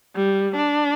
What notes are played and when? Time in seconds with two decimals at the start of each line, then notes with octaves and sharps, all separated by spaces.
0.16 G3
0.56 D4